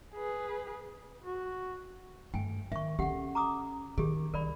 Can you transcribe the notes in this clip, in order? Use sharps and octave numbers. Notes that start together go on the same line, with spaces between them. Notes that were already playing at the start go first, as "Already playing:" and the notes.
G#4 B4
F#4
G2 A3 G5 G#5
D#3 E5 C#6
D3 C#4 G4 F#5
A#5 D6 D#6
D#3 C#4 G4 G#4
C2 D#3 A#4 D5 B5